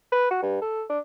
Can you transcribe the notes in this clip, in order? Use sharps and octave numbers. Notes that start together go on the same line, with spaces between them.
B4
F#4
G2
A4
D4